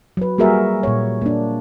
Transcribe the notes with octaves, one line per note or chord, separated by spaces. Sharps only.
F#3 B4
G3 A#3 F#4 G#4 A#4 E5
A#2 C#5
A#3 D4